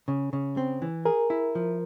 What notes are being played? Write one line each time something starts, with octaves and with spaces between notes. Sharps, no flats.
C#3
C#3
C4
E3
G#4 A#4
E4
F3